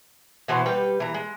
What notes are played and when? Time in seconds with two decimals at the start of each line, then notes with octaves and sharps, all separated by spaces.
0.48 B2 E3 B3 C5
0.66 G3 B4 G5
1.00 E3 A#5
1.14 G#3